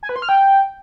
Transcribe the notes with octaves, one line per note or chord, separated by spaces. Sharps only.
G#5
B4
C6
F6
G5